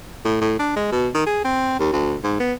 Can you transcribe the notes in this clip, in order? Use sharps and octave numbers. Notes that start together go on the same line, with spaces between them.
A2
A2
D4
G#3
B2
D#3
G#4
C4
D#2
D2
G#2
B3